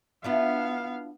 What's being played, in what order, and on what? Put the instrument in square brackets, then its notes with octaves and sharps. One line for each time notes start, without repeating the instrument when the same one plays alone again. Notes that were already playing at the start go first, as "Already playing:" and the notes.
[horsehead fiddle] B3 F5 [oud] D4 E4 F4